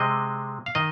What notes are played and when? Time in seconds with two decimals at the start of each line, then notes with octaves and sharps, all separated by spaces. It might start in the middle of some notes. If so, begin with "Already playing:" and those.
Already playing: C3 G#3 C4 D#5
0.66 F5
0.75 D#3 D#5